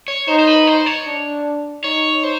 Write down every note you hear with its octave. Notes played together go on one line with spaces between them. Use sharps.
C#5
D#4 C5
C5
B4
C5
C#5
D4
D#4 C#5
C5